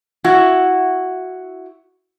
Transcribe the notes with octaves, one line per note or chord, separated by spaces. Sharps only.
E4 F#4